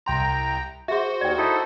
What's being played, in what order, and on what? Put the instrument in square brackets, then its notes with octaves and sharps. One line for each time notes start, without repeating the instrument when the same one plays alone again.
[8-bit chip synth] C2 G5 A#5 [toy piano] C6
[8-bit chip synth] F#4 C5 [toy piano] G#4 E5
[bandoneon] D#2 [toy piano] D5 G5
[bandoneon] D#4 E4 A4